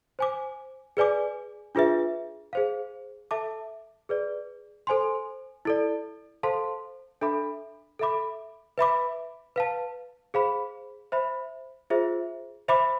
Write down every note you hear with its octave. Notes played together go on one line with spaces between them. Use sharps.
C5 G#5 D6
G#4 B4 D5 G#5 D6
D4 F4 G#4 B4 E5
G#4 C5 F5
A4 E5 A5 D6
G#4 B4 D5
A4 C5 G#5 C6
E4 A4 D5
A4 C5 F5 A5 C6
D4 A4 E5 B5 D6
A4 E5 B5 D6
B4 E5 B5 D6
B4 F5 A5
G#4 C5 F5 B5
C5 E5 B5
F4 G#4 C5 E5
C5 E5 B5 D6